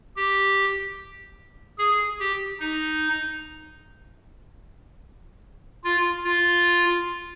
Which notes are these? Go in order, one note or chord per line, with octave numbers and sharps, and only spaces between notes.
G4
G#4
G4
D#4
F4
F4